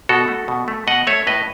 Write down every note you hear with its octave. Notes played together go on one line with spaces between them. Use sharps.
B2 F#4 A4
A3
B2
A3
B2 D#5 F#5
A3 C#5 E5
A2 B4 D#5